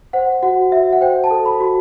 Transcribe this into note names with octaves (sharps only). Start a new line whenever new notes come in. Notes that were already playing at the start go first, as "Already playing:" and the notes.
C5 F#5
F#4 F#5
F#4 E5
F#5
C5 G5
A5
A4
B5
F#4